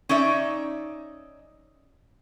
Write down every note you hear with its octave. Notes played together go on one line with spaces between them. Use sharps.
C#4 D#4 D5 E5